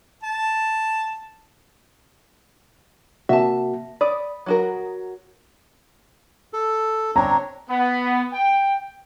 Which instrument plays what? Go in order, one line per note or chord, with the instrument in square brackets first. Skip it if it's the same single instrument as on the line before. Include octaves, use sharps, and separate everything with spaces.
[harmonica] A5
[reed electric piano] C3 A#3 F#4 [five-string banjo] E5 A5
[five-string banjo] D5 [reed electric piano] B5 D#6
[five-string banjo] F#3 F#4 A#4
[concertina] A4
[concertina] C4 D4 C#5 [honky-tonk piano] A#5
[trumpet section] B3
G5